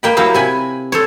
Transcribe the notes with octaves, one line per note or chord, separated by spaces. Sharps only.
A#3 G5 B5
F#3 A#3 E4 G4 F5
C3 G#5 B5
A4 C5 C#5